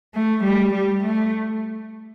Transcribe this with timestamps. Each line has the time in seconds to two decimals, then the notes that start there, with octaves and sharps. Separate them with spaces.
0.14 A3
0.44 G3
0.74 G3
1.04 A3